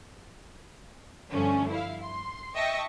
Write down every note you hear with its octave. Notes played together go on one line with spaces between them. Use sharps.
G2 D3 F3 A3 C#4
E4 F5
C6
D#5 E5 G5 A5 C#6 A#6